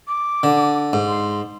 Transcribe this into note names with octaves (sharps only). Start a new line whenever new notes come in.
D6
D3
G#2
C6